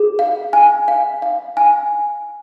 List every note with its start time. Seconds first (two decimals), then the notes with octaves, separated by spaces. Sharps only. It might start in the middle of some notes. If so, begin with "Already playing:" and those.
Already playing: G#4
0.19 F5
0.53 G#5
0.88 F5
1.22 F5
1.57 G#5